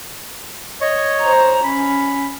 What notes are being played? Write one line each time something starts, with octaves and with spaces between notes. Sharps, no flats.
C#5 D#5 C#6
C5 A#5
C#4 B5